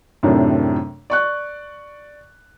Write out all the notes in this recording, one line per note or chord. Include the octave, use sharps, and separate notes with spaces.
F#2 A2 C3 D#3 D4
D5 C#6 F#6